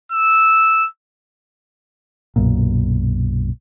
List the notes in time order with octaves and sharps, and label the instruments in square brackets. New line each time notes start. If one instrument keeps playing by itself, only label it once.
[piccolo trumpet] E6
[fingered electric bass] B1 F#2 A#2